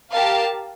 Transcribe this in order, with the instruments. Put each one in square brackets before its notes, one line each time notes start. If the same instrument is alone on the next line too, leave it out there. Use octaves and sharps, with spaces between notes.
[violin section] G4 A#4 F5 A5